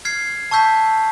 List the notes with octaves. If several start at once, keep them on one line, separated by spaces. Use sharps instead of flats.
F6 G#6 C7
A5 C#6 E6 G6 B6